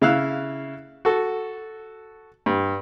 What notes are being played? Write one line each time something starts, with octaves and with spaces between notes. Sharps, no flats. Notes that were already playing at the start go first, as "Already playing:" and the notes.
C#3 E4 F5 E6 F#6
F#4 A4
G2